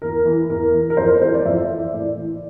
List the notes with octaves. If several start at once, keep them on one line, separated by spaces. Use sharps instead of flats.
E2 A#4
E3
E2 A#4
E3
A#4
F2 C5
E3 C5
D5
F2 E5
E3
A2 D5
E3